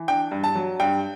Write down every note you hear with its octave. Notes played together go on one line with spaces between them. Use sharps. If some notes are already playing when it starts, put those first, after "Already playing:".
Already playing: E3
D4 G5
G2
A5
F#3
G2 G5